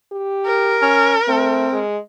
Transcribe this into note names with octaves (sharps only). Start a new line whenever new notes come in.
G4
A#4
C#4
A3 C4
G#3